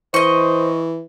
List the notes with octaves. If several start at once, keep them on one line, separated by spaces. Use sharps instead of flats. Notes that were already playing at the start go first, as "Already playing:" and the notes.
E3 C5 D#5 C#6